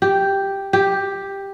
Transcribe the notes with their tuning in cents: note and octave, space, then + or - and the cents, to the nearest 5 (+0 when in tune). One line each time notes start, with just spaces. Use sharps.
G4 +0
G4 +5